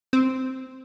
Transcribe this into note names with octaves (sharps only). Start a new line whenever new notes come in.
C4